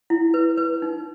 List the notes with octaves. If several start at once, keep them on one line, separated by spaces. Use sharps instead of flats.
E4
B4
B4
D#4